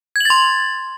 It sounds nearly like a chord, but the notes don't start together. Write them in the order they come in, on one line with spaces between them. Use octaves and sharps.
G#6 F#7 A6 C6